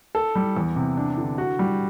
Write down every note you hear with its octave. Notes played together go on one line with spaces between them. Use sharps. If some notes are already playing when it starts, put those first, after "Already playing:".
A4
G3
E2
C3
D4
D3
F#4
G3